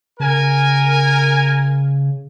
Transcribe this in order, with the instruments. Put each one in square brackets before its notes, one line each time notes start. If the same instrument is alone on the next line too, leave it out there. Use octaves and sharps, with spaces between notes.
[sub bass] C#3 [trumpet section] A#4 G#5